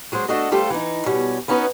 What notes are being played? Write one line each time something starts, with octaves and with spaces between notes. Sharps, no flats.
F#3 G#3 F#4 C5
A3 D4 F#4 A4 D#5
G3 A3 F4 G4 A4 C5
E3 D#4
B2 G3 C#4
B3 C#4 D#4 F#4 B4